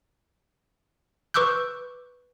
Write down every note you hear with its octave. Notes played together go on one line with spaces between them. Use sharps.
B4 C#6 D6 E6 F#6 G6